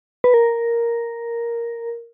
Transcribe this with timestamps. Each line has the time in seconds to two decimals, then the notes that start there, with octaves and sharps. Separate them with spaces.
0.24 B4
0.34 A#4